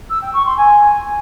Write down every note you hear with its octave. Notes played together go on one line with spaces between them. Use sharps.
E6
G5
C#6
C6
G#5